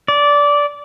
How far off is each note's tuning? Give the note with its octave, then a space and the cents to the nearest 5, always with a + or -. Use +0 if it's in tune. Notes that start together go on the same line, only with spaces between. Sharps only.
D5 -15